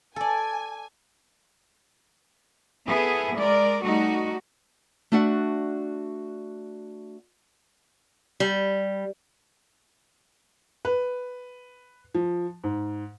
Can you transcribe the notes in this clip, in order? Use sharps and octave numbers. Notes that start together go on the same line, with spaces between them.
A4 D5 G#5
B3 E4 G#4 A4
G#3 A#4 D5
G3 A3 D#4 F#4
A3 D4 F#4 D5 E5 F#5
G3
B4
F3
G#2